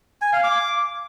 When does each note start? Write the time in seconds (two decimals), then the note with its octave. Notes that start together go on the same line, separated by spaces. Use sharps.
0.22 G#5
0.33 F5
0.44 D6